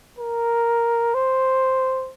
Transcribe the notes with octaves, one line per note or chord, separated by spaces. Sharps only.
A#4
C5